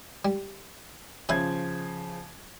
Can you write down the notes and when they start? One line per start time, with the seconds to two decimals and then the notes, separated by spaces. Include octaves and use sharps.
0.25 G3
1.29 C#3 F3 C#4 E5 B5 G#6